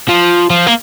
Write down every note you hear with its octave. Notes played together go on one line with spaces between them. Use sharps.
F3
F3
A#3